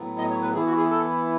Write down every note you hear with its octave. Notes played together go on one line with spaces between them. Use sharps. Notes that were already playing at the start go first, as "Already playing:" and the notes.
Already playing: A2 F#3 B3
D#5
C#5
B4
E3 B3 E4 G#4
F#4
G#4
A4